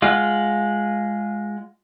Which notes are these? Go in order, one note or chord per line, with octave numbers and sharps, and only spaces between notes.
G#3 F4 F#5